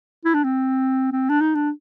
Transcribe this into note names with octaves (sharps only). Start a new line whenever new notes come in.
E4
D4
C4
C4
D4
D#4
D4